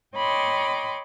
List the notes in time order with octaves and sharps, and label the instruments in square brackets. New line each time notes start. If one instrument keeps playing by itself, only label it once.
[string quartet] C#5 D#5 G5 B5 C6 D6